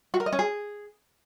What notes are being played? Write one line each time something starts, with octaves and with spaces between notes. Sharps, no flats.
F#4
A#4
D#5
C#4
G#4